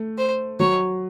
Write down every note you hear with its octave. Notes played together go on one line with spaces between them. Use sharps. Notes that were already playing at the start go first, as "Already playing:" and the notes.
Already playing: A3
C5
F#3 C#5